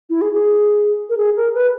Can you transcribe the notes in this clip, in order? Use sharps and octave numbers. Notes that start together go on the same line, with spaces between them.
E4
G#4
G#4
A#4
G#4
A#4
B4